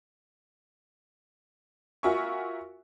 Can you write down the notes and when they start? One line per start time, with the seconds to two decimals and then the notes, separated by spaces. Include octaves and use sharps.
2.03 F4 F#4 A#4 E5 G#5 C#6